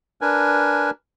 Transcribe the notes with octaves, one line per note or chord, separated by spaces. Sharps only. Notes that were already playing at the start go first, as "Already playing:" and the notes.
D4 A#4 B4 G#5